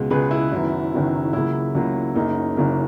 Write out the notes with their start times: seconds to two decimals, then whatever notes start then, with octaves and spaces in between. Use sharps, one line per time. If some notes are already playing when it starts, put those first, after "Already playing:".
Already playing: C#2 B2 G#3
0.10 C#2 B2 G#3 G#4 B4
0.31 E4
0.51 F#1 F#2 D#3 F#3 B3
0.93 F#1 F#2 D#3 F#3 B3
1.33 C#2 C#3 F#3 A#3 E4
1.75 C#2 C#3 F#3 A#3
2.15 F#1 F#2 C#3 F#3 A#3 D#4
2.57 F#1 F#2 C#3 F#3 A#3